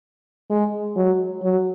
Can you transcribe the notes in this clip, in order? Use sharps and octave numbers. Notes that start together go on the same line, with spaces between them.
G#3
F#3
F#3